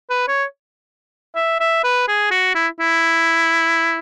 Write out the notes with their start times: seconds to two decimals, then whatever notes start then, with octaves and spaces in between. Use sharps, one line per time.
0.10 B4
0.28 C#5
1.36 E5
1.60 E5
1.84 B4
2.08 G#4
2.31 F#4
2.55 E4
2.80 E4